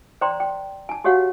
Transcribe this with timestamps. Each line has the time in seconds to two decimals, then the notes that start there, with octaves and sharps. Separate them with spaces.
0.21 C5 D5 G5 A#5 C6
0.40 G5
0.89 G#5 A5
1.04 F#4 G4 C#5 F5 F#5